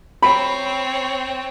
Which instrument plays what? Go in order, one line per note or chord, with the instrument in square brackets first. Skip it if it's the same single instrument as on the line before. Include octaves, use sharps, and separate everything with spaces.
[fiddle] C4 C#5 [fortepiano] B5